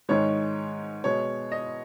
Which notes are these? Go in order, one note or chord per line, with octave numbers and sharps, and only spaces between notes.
G#2 D#3 G#3 C#5
B2 G#3 C#5
D#5